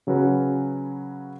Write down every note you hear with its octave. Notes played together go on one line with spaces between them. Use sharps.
C#3 F#3 C#4 F#4 B4